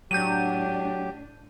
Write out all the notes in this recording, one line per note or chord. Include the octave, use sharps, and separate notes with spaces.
A2 F#3 D4 G4 G6 D#7